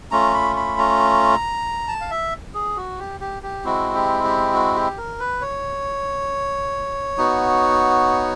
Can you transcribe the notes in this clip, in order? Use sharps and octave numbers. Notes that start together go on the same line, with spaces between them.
A3 C#4 F4 A#5
B5
B5
A#5
A5
F5
E5
G#4
F#4
G4
G4
G4
G#3 C4 E4 F#4
G4
G4
F#4
G4
A#4
B4
C#5
B3 D#4 F#4